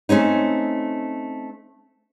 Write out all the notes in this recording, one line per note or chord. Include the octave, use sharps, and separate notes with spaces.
A3 C4 C#4 D#4